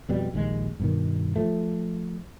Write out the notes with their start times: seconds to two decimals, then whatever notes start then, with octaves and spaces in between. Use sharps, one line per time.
0.09 F2 B2 G3
0.34 A#1 D#2 D3 G#3
0.80 G2 B2 D#3
1.36 F3 A3